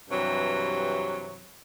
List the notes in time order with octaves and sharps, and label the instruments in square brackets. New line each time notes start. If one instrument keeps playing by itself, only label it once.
[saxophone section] G2 C3 E3 F#3